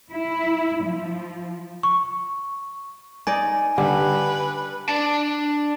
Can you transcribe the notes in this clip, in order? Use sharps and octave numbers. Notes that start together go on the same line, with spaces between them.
E4
F3
C#6
D#4 D5 D#5 G#5
D3 G3 B4
D4 A5